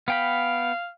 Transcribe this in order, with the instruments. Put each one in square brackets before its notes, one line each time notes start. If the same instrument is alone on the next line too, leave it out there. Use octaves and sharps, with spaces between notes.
[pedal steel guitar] B3 G5 B5 [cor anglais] F5